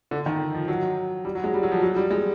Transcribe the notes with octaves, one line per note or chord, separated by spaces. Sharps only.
D3
D#3
F3
F#3
G3
F#3
G#3
G3
F#3
F3
F#3
G3
G#3